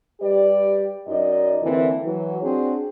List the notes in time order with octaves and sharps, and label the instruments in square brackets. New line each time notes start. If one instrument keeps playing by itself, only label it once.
[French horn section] G3 G4 B4 D5
F#2 D#4 D5 D#5
D3 E3 A#3 C4
E3 F#3
C4 D4 F#4 G#4